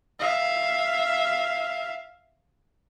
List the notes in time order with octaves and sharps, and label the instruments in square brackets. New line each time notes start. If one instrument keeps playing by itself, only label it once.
[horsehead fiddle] E5 F5